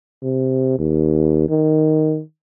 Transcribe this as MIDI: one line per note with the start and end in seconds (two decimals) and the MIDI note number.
0.23 0.78 48
0.79 1.45 39
1.50 2.21 51